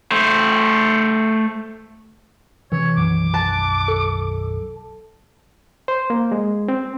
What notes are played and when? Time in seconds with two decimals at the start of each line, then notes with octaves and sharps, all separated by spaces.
0.12 A3 C5
2.72 C3 E3 C#5
2.97 B1 F#2 D#3 D6
3.34 A5 F#6
3.88 A4
5.88 C5
6.10 A#3
6.32 G#3
6.68 C4